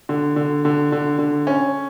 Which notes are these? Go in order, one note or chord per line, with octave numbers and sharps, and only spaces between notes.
D3
D3
D3
D3
D3
C#4